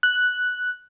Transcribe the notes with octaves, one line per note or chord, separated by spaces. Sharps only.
F#6